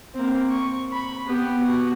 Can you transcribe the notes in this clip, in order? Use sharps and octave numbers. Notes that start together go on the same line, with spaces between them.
A#3 C4
C#6
B5
B3 G4
F#4